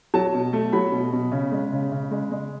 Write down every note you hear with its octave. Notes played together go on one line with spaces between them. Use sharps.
F#3 A5
B2
A3
F#3 B5
B2
B2
C#3
G#3
C#3
C#3
G#3
G#3